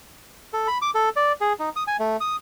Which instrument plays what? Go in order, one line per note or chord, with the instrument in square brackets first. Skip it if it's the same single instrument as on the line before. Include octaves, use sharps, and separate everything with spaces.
[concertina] A4
B5
D6
A4
D5
G#4
D#4
D#6
G#5
A3
D#6